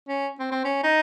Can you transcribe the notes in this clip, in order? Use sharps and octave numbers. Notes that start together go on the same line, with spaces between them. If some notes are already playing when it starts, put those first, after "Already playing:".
C#4
C4
C4
C#4
D#4